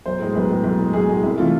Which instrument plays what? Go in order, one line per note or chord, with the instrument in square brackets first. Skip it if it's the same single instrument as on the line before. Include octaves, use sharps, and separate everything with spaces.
[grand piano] B1 C5
A2 G#3
B1 B4
A2 G#3
B1
A2 G#3
B1 G#4
A2 G#3
C2 E4
C3 E3 A3 F4